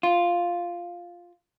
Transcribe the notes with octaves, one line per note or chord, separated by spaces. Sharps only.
F4